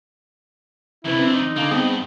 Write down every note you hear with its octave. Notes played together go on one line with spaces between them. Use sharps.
F2 C3 A3 E4 B4
C4 D4
D#4
D3 A#3 F5 A5
G2 B3 C4 G#4